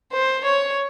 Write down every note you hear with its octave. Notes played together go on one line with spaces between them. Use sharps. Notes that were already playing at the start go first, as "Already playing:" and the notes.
C5
C#5